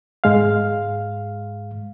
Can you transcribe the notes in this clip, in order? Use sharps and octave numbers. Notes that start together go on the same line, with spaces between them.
G#2 G#3 F5